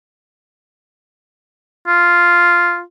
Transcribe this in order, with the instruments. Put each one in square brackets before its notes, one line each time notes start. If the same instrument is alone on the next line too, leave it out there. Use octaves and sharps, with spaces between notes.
[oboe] F4